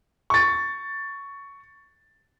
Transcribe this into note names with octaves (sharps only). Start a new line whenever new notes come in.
C#6 A6